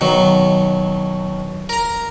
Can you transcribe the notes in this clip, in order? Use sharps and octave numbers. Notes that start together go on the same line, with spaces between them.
B2 D#3 F#3
A#4 A#5